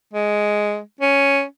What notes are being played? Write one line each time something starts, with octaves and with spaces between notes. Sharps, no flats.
G#3
C#4